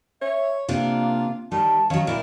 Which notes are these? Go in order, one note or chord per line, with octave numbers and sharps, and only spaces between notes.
C#5 E5
C3 A#3 D4 F4
D#3 G3 A5
D#3 F#3 C#4 F5
A#2 E4 A#4